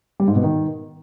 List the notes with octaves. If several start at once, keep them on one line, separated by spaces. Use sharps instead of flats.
G3
G#2
B2
D#3